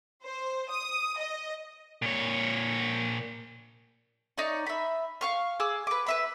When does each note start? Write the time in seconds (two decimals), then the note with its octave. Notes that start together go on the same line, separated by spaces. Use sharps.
0.24 C5
0.72 D#6
1.19 D#5
2.02 A#2 C#5
4.38 D#4 C#5 D5
4.66 E5 B5
5.21 F5 C#6 F6
5.60 G#4 D6 E6
5.87 B4 D6
6.07 B4 E5 B5